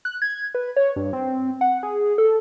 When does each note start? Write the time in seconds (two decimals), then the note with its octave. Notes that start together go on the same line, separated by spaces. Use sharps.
0.05 F#6
0.22 G#6
0.55 B4
0.76 C#5
0.96 G2
1.13 C4
1.61 F#5
1.83 G#4
2.18 A4